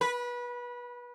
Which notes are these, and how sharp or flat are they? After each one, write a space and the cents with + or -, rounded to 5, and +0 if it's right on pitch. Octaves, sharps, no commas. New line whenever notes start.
B4 -25